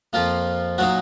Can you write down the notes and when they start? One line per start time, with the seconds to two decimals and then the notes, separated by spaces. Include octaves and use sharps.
0.13 F2 F3 A#3 F4
0.78 A#2 F#3 A#3 D#4 F#4